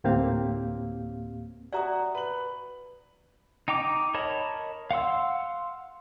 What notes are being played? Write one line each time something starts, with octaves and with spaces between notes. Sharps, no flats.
D2 A2 A#3 C4 G4 F5
F#4 D5 E5 F#5 A#5 D#6
B4 F#7
D#4 G5 A#5 D6
A#4 C#5 D#5 A5 B5
F5 F#5 C6 E6